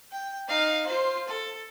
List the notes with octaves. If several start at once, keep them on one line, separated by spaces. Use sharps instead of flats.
G5
D#4 F5
F4 C5
A4